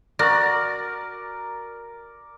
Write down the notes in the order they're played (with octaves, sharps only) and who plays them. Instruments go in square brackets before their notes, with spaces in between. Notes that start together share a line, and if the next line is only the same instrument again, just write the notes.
[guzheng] F#4 [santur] A#4 D5